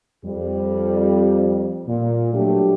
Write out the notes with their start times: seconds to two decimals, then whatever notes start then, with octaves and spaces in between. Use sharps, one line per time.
0.25 F2 G3
1.88 A#2
2.34 F#3 G3 A3 D4 G4